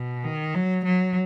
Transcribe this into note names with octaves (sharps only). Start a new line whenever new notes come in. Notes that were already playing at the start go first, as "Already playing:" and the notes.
Already playing: B2
D#3
F#3
F#3